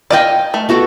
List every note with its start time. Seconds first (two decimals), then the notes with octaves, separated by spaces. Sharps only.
0.10 D5 D#5 F5 G5 G#5
0.54 A3
0.69 B3 F#4 A4